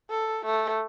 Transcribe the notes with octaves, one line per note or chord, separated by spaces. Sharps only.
A4
A3